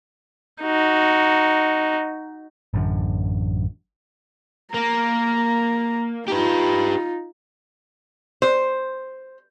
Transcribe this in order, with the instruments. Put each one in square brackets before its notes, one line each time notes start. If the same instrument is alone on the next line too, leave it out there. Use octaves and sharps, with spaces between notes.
[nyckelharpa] D#4 F#4
[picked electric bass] A1 F#2 D3
[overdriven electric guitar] A#3 [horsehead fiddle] A#5
[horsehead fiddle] D#4 F4 [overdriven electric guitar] G4 B4
[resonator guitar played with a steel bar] C5